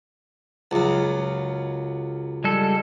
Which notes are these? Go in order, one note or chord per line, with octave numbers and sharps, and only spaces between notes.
C#2 F#2
G3 G#3 A4